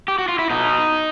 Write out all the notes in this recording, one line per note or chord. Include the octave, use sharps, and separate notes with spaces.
G4
F#4
F4
E4
B2 D#4